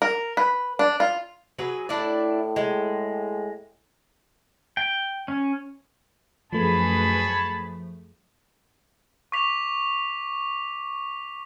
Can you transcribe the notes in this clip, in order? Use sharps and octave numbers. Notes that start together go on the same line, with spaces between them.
A#4
B4
D4
F4
F#3 G#4 B4
A2 D4 E4 D5
G#3
G5
C#4
F#2 F3 A3 G#4 B4 C#5 A5 B5
C#6 D6 B6 F7